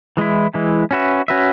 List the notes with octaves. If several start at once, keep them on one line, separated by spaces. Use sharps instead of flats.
E3 G#3 E4
E3 G#3 E4
C#4 F#4 B4 E5
C#4 F#4 B4 E5